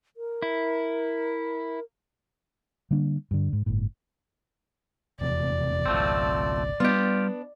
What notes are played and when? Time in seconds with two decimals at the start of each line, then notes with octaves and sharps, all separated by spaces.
0.17 A#4
0.42 E4
2.91 D3 G3 A#3 D4
3.31 G2 D3
3.53 G#2
3.66 G1 A2
5.20 F1 E2 C3 D5
5.86 G#1 C#2 F3 A3 C4
6.80 G3 B3 D4 F4 G4